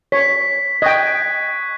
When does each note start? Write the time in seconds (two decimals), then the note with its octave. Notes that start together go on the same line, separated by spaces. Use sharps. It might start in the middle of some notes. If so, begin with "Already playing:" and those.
0.12 C#5 B6
0.82 D#5 G5 C#6 F#6 G#6